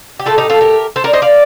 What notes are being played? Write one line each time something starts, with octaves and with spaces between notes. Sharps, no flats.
G4
A2 A3 F4 A4
D#4 G4
F4 A4
G4 A#4
A4 C5
A#4 D5
C5 D#5
D5 F5